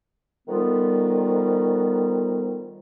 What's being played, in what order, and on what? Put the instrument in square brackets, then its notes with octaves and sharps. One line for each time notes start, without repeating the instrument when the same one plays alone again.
[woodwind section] D3 D#3 F3 G3 B3 F4